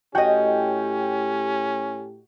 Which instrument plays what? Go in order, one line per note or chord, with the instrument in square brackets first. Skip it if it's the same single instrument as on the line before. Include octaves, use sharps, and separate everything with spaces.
[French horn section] A2 G4 [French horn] C#4 [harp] F#4 D#5 [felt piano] G5